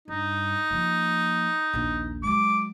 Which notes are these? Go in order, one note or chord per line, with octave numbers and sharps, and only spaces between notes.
G2 D#4
F3 A#3
A#1 D#2
F#3 G#3 D6